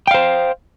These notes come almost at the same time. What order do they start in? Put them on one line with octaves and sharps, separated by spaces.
G5 F5 C5